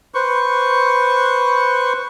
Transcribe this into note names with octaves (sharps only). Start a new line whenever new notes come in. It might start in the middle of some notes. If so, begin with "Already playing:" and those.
B4 C5 C#6